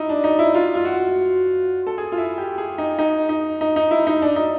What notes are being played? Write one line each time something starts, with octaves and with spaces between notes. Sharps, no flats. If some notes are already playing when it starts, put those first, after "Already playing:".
Already playing: D#4 E4
D4
D#4
E4
F4
F4
F#4
A4
G#4
F4
E4
G4
G#4
D#4
D#4
D#4
D#4
D#4
E4
D#4
D4
D#4